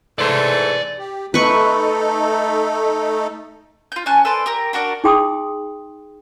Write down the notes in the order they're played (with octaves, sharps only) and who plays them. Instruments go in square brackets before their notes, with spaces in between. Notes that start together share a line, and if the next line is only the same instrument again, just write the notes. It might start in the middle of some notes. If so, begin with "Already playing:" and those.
[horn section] G#2 E3 A3 [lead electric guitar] D5 C6
[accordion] G4
[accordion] A3 D#4 A4 [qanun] B4 C#6
[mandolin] F4 G6
C#4 G#5 A5 F#6
A4 B4 C5 D5
G4 A#4
D4 F#4 A#4 D5
[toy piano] D#4 G#4 G5 C6 D#6